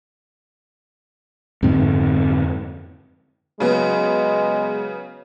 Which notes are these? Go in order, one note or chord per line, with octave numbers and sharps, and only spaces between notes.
F2 G#2 D3 C4
C#3 F#3 G#3 B3